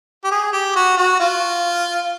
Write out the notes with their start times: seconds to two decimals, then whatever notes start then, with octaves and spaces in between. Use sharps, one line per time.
0.24 G4
0.31 G#4
0.53 G4
0.76 F#4
0.97 F#4
1.20 F4